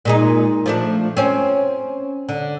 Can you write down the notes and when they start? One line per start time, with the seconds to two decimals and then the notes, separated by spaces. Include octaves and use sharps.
0.05 A#2 G#3 D#4
0.66 F3 A3 D4
1.17 C4 C#4 C5
2.29 D3